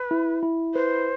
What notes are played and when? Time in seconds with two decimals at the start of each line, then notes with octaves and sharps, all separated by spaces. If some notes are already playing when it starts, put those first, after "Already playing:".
Already playing: B4
0.11 E4
0.43 E4
0.75 B4 C5